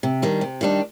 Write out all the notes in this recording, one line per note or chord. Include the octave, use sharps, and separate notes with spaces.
C3
D#3 G3 D4
C3
D#3 G3 D4